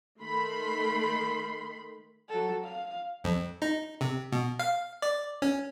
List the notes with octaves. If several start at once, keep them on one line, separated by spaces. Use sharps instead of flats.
D#3 A3 B5 C6
F#3 A4
F5
F2
D#4
C3
B2
F5
D5
C#4